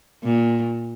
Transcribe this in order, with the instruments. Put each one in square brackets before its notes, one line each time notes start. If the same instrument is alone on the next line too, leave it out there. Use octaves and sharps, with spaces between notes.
[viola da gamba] A#2